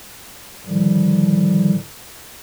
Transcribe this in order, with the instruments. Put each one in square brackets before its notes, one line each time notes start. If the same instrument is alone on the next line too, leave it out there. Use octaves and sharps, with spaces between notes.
[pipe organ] A2 D3 D#3 F3 G3